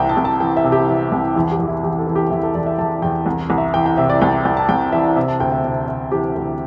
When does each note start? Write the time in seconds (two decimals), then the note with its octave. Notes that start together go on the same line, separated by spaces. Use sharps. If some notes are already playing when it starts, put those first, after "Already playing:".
Already playing: C2 C3 E3 E5 G5
0.09 A5
0.17 C2
0.25 A5
0.40 E3 G5
0.57 E5
0.64 C3
0.72 G4
0.88 E3
1.12 C2
1.36 E2 E4
1.51 G4
1.59 E2
1.68 E4
1.83 E2 G4
1.99 A4
2.07 E3
2.16 G4
2.30 E2 E4
2.43 A4
2.55 E2 D5
2.66 E5
2.79 E2 A5
3.02 E2 G5
3.26 C2
3.50 C2
3.58 E5
3.74 E3 G5
3.86 G5
3.97 C3 E5
4.10 D5
4.21 C2 G5
4.45 C2 G5
4.57 A5
4.69 C2 G5
4.92 E3 E5
5.16 C3 E5
5.28 A5
5.40 D2 G5
5.52 E5
5.64 C3
5.88 C3
6.12 E3 G4
6.36 D2